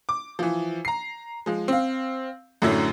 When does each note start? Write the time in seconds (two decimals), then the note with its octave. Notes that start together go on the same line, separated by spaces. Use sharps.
0.09 D6
0.39 E3 F3
0.85 A#5 C7
1.46 F3 G#3
1.68 C4 F5
2.62 F#2 A2 D3 F#3 C#4 E4